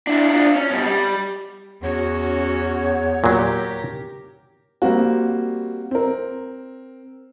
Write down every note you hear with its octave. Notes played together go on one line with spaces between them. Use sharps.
D4 E4
D4 F4
C#4
B2 G3
G3
E2 C#4 F#4 C#5
A#2 F#3 G4 A#4
G3 A#3 C4 F#4
C4 A#4